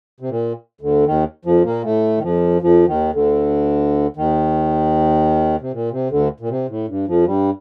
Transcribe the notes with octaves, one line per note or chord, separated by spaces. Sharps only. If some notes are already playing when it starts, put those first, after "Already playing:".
C3
A#2
D2 D3
D#2 D#3
F2 F3
A#2 A#3
A2 A3
D#3
F2 F3
F2 F3
D#2 D#3
D2 D3
D#2 D#3
C3
A#2
C3
D2 D3
A#2
C3
A2
G2
F2 F3
G2 G3